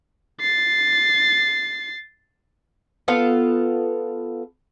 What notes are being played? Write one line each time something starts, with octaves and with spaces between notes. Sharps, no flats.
A6 C7
B3 F4 A4 F5